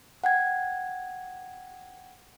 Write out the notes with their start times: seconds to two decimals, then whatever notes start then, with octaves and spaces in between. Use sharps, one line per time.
0.24 F#5 G5 G#6